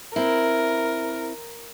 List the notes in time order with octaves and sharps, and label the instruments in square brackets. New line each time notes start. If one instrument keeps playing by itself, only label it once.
[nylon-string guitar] C4 E4 [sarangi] A#4